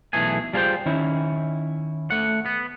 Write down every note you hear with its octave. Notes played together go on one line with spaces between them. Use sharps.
B1 E3 A3 G#4 G#5
G3 F4 G#4 A4 C5 G5
D#3 C#4 E4
A3 F#5
B3